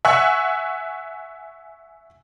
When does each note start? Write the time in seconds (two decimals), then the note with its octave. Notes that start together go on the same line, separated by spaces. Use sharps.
0.05 E5 F#5 G#5 C#6 F#6